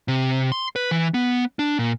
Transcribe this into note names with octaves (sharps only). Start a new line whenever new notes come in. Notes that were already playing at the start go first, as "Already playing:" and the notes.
C3
C6
B4
E3
B3
D4
A#2